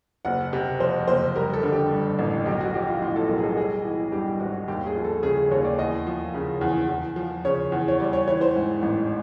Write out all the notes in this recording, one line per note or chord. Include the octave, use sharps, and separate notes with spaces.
F#1 F#5
C3
F2 C5
F#1 C5
G3 A#4
A4
D3
G4
G2
A1
B1 G4
F#4
F3 G4
F4
A2 F4
A4
B1 A#4
G#4
A4
G3 G#4
E3
G2 G4
G#1 F#4
D#2 G4
G#4
F3
A4
C#3 G#4
G#4
D#2 C#5
D5
E2 D#5
F3
C#3
E2
E2
F3
C#3 C#5
E2
C#5
G3 D5
C#5
E3 C#5
C5
G#2
A1